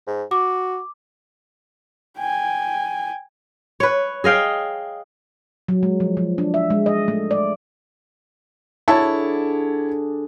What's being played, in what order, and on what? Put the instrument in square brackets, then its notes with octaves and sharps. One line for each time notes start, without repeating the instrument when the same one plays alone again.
[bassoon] G#2
[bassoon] F#4 [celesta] D6
[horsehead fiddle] G5 G#5
[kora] B4 C#5
G#4 D#5 F5 G5
[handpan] F#3
G#3
F3
F3
D4
E5
G#3
D#5
A3
D5
[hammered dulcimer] D3 G#4 D5 [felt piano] E4 C#5 A5